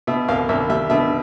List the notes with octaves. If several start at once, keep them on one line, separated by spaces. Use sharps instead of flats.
B2 E5
C2 F5
C2 E5
G3 E5
B2 E5